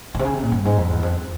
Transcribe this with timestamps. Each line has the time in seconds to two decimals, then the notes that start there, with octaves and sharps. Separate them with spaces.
0.15 A#2
0.19 C3
0.25 C#3
0.34 C3
0.43 A#2
0.52 G2
0.65 G#2
0.77 F2
0.90 E2
1.03 F2